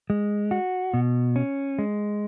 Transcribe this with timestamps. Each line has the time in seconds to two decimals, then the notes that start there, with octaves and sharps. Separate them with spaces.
0.10 G#3
0.51 F#4
0.94 B2
1.36 C#4
1.79 G#3